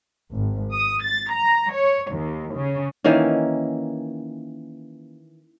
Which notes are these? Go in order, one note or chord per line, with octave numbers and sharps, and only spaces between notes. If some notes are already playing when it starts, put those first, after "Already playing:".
G#1
D#6
A6
A#5
C#5
D#2
C#3
D#3 E3 A#3 C#4